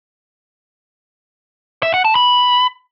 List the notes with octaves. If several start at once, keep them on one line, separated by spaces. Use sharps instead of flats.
E5
F#5
A5
B5